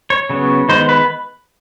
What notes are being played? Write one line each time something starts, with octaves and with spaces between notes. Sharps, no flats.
C#5
C#3 F#3 B3
D#3 G#3 B3 C5
B4